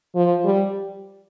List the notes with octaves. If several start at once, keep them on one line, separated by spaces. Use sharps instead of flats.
F3
G3